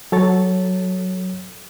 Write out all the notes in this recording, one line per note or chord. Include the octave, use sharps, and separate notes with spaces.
F#3 A4 C#5 A6